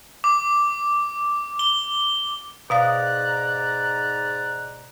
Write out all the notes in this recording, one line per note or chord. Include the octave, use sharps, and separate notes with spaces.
D6
G7
G#2 B2 D5 F5 A#5 D#6 F#6